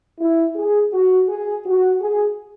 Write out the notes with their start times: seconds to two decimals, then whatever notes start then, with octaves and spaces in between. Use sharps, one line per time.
0.19 E4
0.56 G#4
0.93 F#4
1.29 G#4
1.66 F#4
2.01 G#4